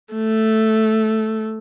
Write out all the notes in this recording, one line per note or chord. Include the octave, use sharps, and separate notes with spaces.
A3